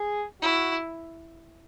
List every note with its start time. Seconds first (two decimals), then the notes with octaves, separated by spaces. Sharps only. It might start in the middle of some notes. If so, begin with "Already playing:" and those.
Already playing: G#4
0.42 E4 F#4